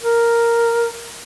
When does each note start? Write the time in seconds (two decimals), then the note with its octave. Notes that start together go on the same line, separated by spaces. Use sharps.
0.03 A#4